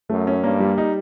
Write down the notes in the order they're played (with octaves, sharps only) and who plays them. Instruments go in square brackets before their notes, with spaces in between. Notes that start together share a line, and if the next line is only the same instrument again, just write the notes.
[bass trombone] F#2 [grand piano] A3
[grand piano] C#4
[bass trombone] G2 [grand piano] A#3
[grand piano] G3
D#4